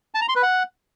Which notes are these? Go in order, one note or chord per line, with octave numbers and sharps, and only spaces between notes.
A5
A#5
C6
B4
F#5